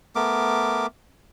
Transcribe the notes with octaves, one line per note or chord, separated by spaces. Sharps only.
A3 B3 A#4 D6